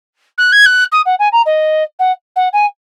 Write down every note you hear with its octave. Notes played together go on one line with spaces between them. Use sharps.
F#6
G#6
F#6
D#6
F#5
G#5
A#5
D#5
F#5
F#5
G#5